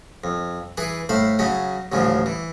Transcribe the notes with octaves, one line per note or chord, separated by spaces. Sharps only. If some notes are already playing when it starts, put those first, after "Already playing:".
F2
E3 G#4 B4
A2 A3 C5 F5 B5
C#3 F#3 C#4 D#5
A1 D2 C#3 F3 G#3
E3